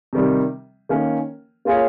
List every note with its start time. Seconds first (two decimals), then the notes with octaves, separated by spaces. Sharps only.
0.13 C3 D#3 G3
0.89 D#3 A#3 C#4
1.65 A#3 F4 G#4 C#5